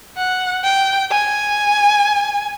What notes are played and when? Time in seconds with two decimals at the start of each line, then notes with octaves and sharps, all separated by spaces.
0.17 F#5
0.64 G5
1.11 G#5